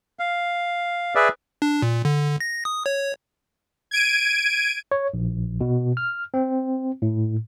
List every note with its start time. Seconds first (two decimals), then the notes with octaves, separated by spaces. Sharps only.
0.19 F5
1.15 G#4 B4 D5 E5
1.62 D4
1.82 A#2
2.05 D3
2.40 A#6
2.65 D#6
2.86 C#5
3.91 G#6 D7 D#7
4.92 C#5
5.14 A#1
5.61 B2
5.97 F6
6.34 C4
7.02 A2